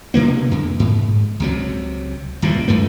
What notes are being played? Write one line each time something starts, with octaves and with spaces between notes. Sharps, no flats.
B2 D3 A#3 B3
F2
G#2
C#2 C3 F#3
D#1 C#2 G#2 B2
C#2 F#2 A3 B3